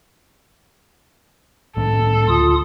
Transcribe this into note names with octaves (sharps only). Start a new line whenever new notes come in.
C2 A2 C#4 A4
D2 F4 D#6